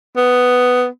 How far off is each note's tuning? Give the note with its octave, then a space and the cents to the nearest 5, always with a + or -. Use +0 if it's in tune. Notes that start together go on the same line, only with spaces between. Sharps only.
B3 +10